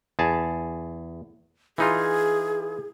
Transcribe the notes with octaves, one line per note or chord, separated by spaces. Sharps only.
E2 G#4 A5
E3 D#4 F4 G#4